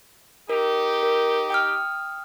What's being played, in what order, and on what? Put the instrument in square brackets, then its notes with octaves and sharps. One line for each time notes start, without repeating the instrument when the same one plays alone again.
[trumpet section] D#4 G4 [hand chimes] A#4
[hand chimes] A#4
G5 D#6 F6